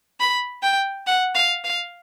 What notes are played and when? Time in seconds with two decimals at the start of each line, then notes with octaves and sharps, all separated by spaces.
0.20 B5
0.63 G5
1.07 F#5
1.35 F5
1.64 F5